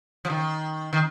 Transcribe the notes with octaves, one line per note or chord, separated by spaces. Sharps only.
F3
D#3
D#3